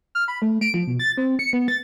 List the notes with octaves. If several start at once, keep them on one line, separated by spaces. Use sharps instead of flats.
F6
B5
A3
D7
F3
B2
A6
C4
C#7
B3
A6